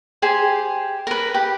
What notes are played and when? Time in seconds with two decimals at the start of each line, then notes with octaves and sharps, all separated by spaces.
0.22 G4 G#4 C5
1.07 A#4 B4
1.34 G4